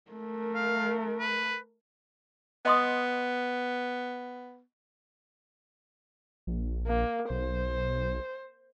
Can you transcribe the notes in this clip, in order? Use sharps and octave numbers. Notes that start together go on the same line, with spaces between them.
A3 A#4
F5
B4
B3 D#5 C6 D#6
A#1
A#3
B1 C5